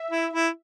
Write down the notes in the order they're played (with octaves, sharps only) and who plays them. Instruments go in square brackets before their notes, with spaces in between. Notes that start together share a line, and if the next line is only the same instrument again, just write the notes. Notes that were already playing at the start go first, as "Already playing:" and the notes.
Already playing: [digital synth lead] E5
[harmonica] E4
E4